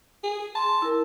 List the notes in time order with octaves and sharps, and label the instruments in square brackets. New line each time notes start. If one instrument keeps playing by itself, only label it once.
[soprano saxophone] G#4
[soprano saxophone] A5 [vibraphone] C6
[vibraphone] E4 A#4